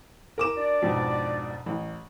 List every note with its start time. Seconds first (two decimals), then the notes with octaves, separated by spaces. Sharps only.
0.38 A#4 D6 E7
0.56 D4 F#4 D5
0.82 F2 G#2 B2
1.66 A1